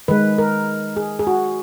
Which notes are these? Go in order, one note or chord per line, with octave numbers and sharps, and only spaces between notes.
D#3 G#3 B4
A#4
G#4
G#4
F#4